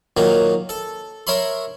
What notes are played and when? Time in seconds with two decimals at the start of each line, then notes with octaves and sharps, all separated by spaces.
0.17 A#2 D#3 F#3 A#3
0.69 A4
1.27 A#4 C#5 E5 B5 C6